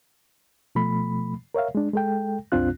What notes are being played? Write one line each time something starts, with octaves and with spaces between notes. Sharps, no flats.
B2 F3 A3 B5
A#4 C#5 E5 F5
G#3 D4
G#3 A4 G5
C2 F#2 C4 D4 F4 F#6